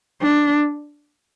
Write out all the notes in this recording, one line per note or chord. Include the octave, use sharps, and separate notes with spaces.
D4